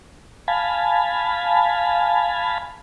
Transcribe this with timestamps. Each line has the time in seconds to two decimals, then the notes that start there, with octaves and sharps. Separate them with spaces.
0.48 F5 G#5 A5 B5